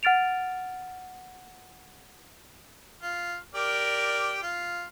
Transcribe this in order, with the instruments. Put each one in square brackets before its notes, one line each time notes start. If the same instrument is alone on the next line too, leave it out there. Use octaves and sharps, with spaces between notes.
[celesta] F#5 F6 A6 D7 F7
[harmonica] F4
G4 A#4 D5
F4